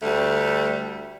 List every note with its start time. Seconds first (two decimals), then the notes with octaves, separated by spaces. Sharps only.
0.02 D2 G3 A3